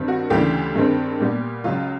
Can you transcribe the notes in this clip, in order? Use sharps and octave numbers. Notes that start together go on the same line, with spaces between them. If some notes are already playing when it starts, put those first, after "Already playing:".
Already playing: G2 D#3 G3 C4
F#4
D2 C#3 E3 G3 G4
G2 D#3 G#3 C4
A#2 G3 B3
C#2 C#3 F#3 F4